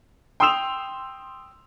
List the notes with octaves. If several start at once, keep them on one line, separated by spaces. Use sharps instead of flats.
G5 C6 D#6 E6 E7 F7